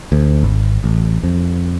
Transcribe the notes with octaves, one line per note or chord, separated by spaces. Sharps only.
D2
G#1
A1
F2